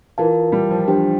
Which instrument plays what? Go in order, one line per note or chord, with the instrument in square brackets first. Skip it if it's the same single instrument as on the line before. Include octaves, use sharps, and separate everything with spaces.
[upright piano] E3 [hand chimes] F4 A#4 F5 A5
[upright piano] G3
F3
[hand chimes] D4 G4 C5 G5